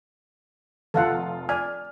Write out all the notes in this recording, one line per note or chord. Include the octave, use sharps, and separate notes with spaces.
F1 F4 A4 F5 F#5
D5 G#5 F6